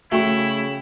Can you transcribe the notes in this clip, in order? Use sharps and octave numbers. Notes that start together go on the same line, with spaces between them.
C#3 A3 E4 F#4 G5 C#6